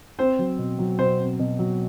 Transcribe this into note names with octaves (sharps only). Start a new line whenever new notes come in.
C4 C5
F#3
B2
F#3
B2 C5
C4
B2
F#3